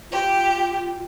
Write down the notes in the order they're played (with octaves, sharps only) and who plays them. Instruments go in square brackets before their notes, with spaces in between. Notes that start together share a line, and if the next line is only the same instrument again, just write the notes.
[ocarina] F4 [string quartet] G4